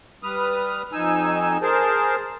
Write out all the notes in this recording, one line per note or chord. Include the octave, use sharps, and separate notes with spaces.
G3 B4 D#6 F6
F2 D#4 G#5 E6
G#4 A#4 C5 A5